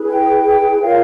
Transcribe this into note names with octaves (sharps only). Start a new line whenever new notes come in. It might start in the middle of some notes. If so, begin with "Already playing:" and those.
Already playing: E4 G#4 B4
G5
G5
F4 A#4 C#5 F5